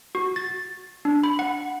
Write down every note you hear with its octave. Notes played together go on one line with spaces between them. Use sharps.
F#4
A6
D4
B5
F#5